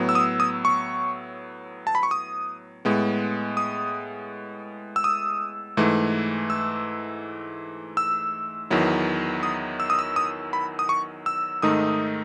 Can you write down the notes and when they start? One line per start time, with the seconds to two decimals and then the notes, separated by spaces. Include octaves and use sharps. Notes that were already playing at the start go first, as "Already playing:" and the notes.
Already playing: A2 F#3 B3
0.09 E6
0.15 D#6
0.40 D#6
0.65 C#6
1.87 A5
1.95 B5
2.03 C#6
2.11 D#6
2.85 A2 G#3 B3
3.57 D#6
4.96 E6
5.04 D#6
5.77 G#2 E3 A3
6.50 E6
7.97 E6
8.70 E2 D#3 F#3 B3 E4
9.43 D#6
9.80 E6
9.90 D#6
9.99 E6
10.16 D#6
10.53 B5
10.79 D#6
10.89 C#6
11.26 E6
11.62 G#2 D#3 A3 D#4 D#6